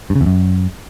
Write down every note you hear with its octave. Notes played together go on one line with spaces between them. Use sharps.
G2
C#3
E2
F#2